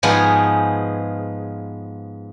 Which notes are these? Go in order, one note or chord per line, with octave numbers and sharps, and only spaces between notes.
G#2 F3 B3 D#4 G#4